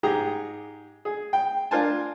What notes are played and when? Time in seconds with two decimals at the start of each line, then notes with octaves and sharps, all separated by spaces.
0.03 G#2 G4 G#4 A#5
1.05 G#4
1.33 G5
1.71 D4 F4 A#4 C5 G#5 A5